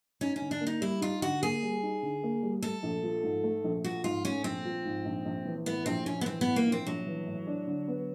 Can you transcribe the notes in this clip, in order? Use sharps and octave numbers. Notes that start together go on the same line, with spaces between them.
C#4 D#4
C#4
D3
D4
A#3
D#4
G3 E4
D#4 F4
D3 F#4
A#3 G#4
G3
D#4
D3
A#3
G3
A3 A4
A#1
F3
G#2
A3
A#1
F3 F#4
G#2 F4
A3 C#4
A#1 C4
F3
G#2
A#1
A#1
E3
A2 B3
A#1 C4
A#1 C#4
B3
E3 C4
B3
A2
A#3
A#1
C4
A#1 F#3
E3
A2
D4
D3
B3